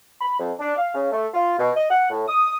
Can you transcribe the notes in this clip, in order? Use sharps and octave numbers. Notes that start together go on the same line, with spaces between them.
B5
F2
D4
F5
C#3
A3
F4
B2
D#5
F#5
A2
D#6